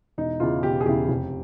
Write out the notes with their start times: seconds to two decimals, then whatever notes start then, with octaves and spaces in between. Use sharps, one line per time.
0.18 E1 D#4
0.40 E2 C#3 E3 F4
0.63 E1 G4
0.80 G#4
0.86 E2 C#3 E3 G4
1.08 F1